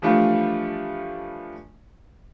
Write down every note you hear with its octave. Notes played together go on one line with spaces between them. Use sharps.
E3 F3 G3 A3 D4 F4